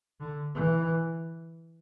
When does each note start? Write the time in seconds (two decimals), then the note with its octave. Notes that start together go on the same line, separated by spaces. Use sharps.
0.20 D3
0.55 E3